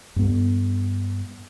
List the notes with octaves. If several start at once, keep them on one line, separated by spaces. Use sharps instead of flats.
G2 B3